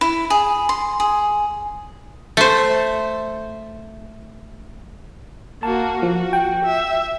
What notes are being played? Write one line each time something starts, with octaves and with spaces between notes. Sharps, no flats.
E4
G#4
C6
G#4
A3 C5
A#3 F#4 A5
F3 F#4
G5
E5